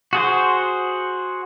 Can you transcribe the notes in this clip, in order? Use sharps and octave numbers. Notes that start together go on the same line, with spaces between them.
F#4 G#4 C5